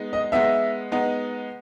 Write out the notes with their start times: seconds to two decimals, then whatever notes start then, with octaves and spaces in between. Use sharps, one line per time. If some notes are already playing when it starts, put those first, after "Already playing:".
Already playing: G#3 B3 D#4
0.13 D#5
0.32 G#3 B3 D#4 E5
0.92 G#3 B3 D#4